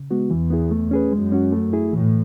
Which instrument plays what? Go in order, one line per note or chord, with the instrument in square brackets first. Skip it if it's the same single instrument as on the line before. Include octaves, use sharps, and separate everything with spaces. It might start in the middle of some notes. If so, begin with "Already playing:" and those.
Already playing: [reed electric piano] C#3
G#3 B3 F#4
[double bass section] E2 [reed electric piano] E3
[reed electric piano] B3 E4 G#4
A3
C#4 G#4 B4
[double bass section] F#2 [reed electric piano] G#3
[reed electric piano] C#4 F#4
A3
E4 G#4
[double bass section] A2 [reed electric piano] E3